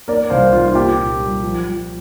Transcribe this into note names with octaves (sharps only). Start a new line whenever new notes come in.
A#3 A#4 D5
C2 C5 F5
C2 F4
F4
A#3 G4
A#2
G3
F3
F3